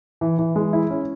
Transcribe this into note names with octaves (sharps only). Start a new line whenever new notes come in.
E3
E3
G#3
E4
C#4